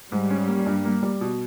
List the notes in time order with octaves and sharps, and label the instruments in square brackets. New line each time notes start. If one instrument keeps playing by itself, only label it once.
[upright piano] G#2 [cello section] G3
[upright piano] C#4
A#3
G2
A#3
G3
B2